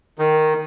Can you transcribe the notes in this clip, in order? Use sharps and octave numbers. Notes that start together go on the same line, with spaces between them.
D#3